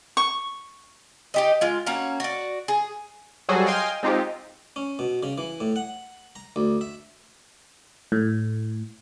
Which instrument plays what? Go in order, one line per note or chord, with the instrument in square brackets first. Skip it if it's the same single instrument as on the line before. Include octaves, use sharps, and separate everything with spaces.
[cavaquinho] C#6
[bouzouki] D#4 G4 D#5
G#3 F4
A#3 C#4 F#4 F5
F#4 D5
G#4
[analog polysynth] F#3 G3 F#4 G#4 A4 C5
D#5 F5 G5 G#5 C6
G#3 C4 D#4 F4 G4
[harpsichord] C#4
B2
C#3
E3
A2
F#5
A#5
D2
E5
[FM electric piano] A2